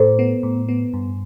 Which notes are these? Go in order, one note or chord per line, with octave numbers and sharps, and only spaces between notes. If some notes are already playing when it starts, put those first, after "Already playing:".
Already playing: A2 A4 C5
B3
A2
B3
G2